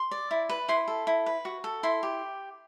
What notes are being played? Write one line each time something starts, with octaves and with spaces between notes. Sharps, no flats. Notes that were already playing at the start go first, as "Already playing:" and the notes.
Already playing: C6
D5
E4
B4
E4 C6
A4
E4
B4
F#4
A4
E4 C6
G4